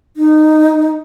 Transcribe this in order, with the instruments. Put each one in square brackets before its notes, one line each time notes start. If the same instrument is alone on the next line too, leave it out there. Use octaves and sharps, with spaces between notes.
[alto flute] D#4